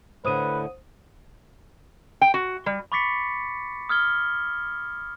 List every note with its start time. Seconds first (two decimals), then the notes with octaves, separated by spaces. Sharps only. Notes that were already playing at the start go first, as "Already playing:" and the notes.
0.25 A2 D3 B4 C5 D#6 D#7
2.21 G5
2.34 F#4
2.66 G3
2.92 B5 C#6 D6 A6 B6 C#7
3.89 D#6 F6 G#6 G7